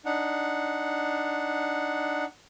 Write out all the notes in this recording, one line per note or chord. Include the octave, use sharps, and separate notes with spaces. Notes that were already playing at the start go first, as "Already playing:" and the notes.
D4 D#4 F#5